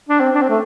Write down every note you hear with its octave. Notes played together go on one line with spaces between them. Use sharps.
D4
C4
D4
C4
A3